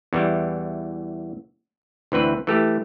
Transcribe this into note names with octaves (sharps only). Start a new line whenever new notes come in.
E2 E3 G3
D2 E3 C4 B4
E3 A3 G4